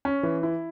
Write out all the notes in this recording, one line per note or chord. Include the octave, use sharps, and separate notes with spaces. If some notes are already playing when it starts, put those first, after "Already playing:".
C#4
E3
E4